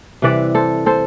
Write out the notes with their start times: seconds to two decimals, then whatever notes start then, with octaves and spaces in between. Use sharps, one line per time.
0.22 C3 E3 G3 B4 D5
0.55 A4 C5
0.86 A4 C5